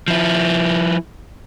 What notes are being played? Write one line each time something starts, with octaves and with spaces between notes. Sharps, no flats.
F3 E4